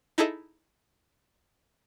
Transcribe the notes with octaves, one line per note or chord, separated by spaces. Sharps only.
D#4 E4 G#4 A4 D#5 E5